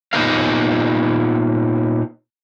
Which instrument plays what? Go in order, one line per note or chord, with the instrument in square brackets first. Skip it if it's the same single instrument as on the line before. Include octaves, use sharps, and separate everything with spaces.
[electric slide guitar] A#2 B3 D#4 G4 A#4 F5